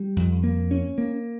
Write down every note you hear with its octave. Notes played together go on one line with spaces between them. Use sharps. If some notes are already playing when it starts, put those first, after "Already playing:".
Already playing: G3
F2
A#3
C#4
A#3